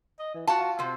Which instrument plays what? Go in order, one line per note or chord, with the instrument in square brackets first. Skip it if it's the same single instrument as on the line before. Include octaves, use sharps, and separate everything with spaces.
[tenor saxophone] D#5
E3
[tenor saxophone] F4 [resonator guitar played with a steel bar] F#4 A5
[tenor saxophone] F4
[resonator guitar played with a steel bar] C3 C4